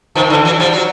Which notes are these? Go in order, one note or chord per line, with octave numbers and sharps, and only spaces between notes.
D#3 F3
D3 E3
E3 F#3
F3 G3
F#3